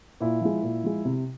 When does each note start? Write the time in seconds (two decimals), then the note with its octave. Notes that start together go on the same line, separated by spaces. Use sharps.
0.20 A#2 E4
0.41 F3 G#3
0.62 A#2
0.84 F3 G#3
1.05 C3